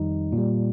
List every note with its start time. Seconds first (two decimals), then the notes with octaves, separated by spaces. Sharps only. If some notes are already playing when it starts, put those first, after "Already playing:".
Already playing: F2 D#3 G3 D#4
0.32 A#2
0.37 G3